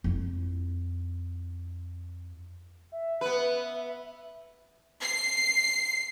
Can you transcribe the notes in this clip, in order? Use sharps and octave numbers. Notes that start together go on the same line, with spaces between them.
F2 E4
E5
B3 B4
C7